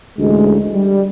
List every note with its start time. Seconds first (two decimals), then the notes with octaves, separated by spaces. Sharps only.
0.19 A1 D2 G#3
0.73 G3